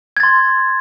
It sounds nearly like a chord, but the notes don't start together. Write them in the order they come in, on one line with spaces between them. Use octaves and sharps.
G#6 A6 C6